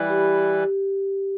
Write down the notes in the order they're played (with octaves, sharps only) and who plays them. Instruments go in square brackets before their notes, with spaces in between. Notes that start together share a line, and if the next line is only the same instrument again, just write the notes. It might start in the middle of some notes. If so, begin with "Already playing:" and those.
Already playing: [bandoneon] E3 G3 E4 B4
[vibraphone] G4